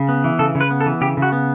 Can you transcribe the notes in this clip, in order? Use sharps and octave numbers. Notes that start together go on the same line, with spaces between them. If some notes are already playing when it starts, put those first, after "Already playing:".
Already playing: C#3
B3
E3
C#3 A4
C#3
B4
B3
A4
E3
C#3 G4
C#3
F#4
B3